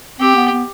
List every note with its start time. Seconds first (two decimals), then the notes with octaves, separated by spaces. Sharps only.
0.20 C4 G4
0.36 B3
0.52 B3